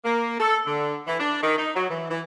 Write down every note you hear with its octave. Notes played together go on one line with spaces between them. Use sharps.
A#3
A4
D3
E3
D4
D#3
D#4
F#3
E3
E3